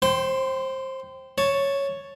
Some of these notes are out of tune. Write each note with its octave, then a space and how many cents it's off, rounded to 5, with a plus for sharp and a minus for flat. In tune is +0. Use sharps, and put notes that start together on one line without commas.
C5 +20 G5 -5 C6 -30
C#5 +0 A5 +0